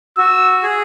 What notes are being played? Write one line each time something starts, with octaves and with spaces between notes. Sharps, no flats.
F#4 E6
G#4